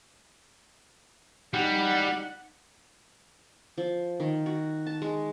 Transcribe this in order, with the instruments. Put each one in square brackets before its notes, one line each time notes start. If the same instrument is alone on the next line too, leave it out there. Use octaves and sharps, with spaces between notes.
[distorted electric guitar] G3 [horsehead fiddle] D#4 F#5
[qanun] F3
D#3
F#4
A5
G#3